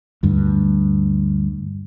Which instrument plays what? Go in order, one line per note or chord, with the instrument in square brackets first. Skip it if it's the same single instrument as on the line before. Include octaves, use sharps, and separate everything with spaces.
[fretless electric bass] D2 G2